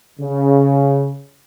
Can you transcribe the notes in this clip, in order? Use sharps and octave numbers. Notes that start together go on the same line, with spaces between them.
C#3